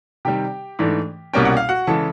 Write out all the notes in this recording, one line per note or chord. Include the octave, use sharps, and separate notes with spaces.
C3 D#3 G3 G4 G5
G#2 E3 A3 D4
C2 B2 G3 A#3 C#4 G5
F#5
F5
F#4 F#5
C#3 E3 G#3 A4 A5